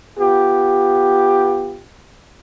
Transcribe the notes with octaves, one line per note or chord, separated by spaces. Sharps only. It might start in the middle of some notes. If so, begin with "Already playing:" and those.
B3 F4 G4